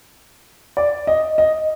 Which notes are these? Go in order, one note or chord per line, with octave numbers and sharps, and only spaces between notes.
D5
D#5
D#5